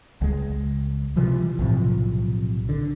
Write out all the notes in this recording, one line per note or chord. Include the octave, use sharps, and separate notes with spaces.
C#2 G#3
C3 E3 F3 G3
B1 A2 C3 F3
D3